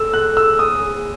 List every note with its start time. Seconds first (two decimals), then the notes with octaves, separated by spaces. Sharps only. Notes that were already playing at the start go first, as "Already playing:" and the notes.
Already playing: A4 E6
0.13 F#6
0.37 E6
0.59 G#4 D#6
0.82 G#4